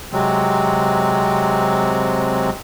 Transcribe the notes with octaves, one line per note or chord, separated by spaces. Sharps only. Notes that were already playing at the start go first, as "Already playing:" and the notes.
C3 F#3 G#3 C4